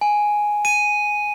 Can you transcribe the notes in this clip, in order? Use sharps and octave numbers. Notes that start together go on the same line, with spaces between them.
G#5
D#7